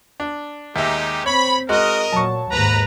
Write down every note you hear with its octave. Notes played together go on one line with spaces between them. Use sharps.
D4
D#2 G#3 D#4 G4 E5
C4 C#5 B5
G#3 F#4 A#4 D#5
A#2 F#3 A5 C#6
D#2 G#2 B4 A#5